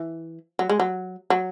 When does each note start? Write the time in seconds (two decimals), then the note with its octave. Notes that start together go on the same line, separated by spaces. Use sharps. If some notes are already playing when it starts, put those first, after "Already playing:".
Already playing: E3
0.59 F#3
0.69 G#3
0.80 F#3
1.30 F#3